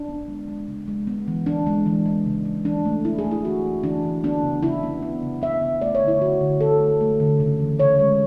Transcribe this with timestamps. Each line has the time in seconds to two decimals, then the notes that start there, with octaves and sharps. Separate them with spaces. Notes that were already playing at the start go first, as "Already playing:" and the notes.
Already playing: D4
0.09 B3
0.28 G#3
0.48 G#3
0.68 C#3
0.88 G#3
1.07 B3
1.28 E3
1.46 E3 D4
1.67 G#3
1.86 E3
2.06 G#3
2.26 C#3
2.45 G#3
2.65 E3 D4
2.85 A3
3.05 E3 E4
3.19 G#4
3.25 A3
3.31 E4
3.44 E3 F#4
3.65 E3
3.84 E3 D4
4.03 E3
4.24 B3 D4
4.44 C#3
4.63 C#3 E4
4.83 B3
5.02 B3
5.23 C#3
5.42 B3 E5
5.62 C#3
5.82 A3 D5
5.95 C#5
6.01 D3
6.08 E4
6.21 D3 F#4
6.41 D3
6.61 D3 A4
6.80 A3
7.01 A3
7.20 D3
7.40 C#3
7.60 E3
7.79 C#3 C#5
7.99 G#3